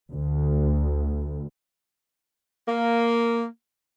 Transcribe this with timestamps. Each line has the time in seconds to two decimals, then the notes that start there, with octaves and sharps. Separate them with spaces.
0.11 D2
2.67 A#3